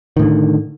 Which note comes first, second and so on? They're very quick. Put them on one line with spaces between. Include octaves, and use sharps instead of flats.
D#3 A2 D3